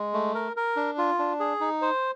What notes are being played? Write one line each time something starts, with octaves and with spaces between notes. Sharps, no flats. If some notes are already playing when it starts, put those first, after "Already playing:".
Already playing: G#3
A3
A#4
A#4
D4
F4
D4
G#4
D#4
C5